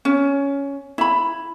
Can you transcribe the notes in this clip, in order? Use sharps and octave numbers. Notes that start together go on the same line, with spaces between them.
C#4
E4 B5